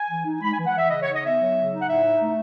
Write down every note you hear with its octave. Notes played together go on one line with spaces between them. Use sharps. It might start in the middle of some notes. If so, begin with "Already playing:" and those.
Already playing: G#5
E3
D#4
G#3 B5
G#5
E3
F#5
E3 E5
C#3 D#5
C#5
D#4
D#5
B3 E5
F#3
C#3
D#4
F#5
A2 E5
D#4
A3